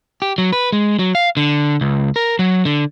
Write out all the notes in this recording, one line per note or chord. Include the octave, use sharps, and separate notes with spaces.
G4
F#3
B4
G#3
F#3
F5
D3
C#2
A#4
F#3
D3